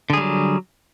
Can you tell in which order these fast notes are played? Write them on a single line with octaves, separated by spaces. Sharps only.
D3 G#4 G3 F#3